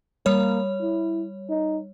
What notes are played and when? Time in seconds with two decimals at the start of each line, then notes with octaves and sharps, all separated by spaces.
0.26 G3 A#3 C#5
0.81 E4
1.49 D#4